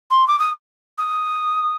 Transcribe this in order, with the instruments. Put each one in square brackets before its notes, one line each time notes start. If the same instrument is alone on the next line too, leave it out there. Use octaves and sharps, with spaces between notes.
[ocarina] C6
D6
D#6
D#6